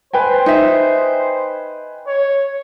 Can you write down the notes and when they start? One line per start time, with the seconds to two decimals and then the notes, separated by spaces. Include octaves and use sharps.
0.13 B4 C5 G5 G#5
0.46 D#4 E5
2.07 C#5